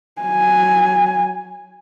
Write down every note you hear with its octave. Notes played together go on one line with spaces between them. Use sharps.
F#3 G#5